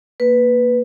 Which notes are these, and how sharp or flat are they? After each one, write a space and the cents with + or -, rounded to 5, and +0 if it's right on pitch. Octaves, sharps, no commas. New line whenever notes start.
A#3 +0 B4 +0